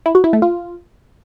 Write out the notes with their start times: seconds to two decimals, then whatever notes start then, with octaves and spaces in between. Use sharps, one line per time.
0.06 E4
0.15 F#4
0.24 E4
0.33 A3
0.42 F4